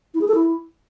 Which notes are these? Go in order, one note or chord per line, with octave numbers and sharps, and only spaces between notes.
E4
G#4
A4
E4